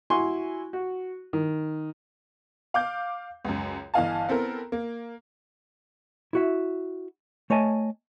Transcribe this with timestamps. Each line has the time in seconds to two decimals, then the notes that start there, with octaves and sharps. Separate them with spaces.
0.10 E4 F#4 G#5 C6 C#6
0.73 F#4
1.33 D#3
2.74 F5 D6 G6
3.45 C#2 F#2
3.94 G1 E3 D#5 F5 G#5 A5
4.29 B3 C4 E4 A4 A#4
4.72 A#3
6.33 E4 F#4 E5
7.50 A3 C#5 D#5 G#5 A5